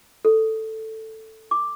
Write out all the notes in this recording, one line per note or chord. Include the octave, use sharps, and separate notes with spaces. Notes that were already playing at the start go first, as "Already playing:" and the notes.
A4
D6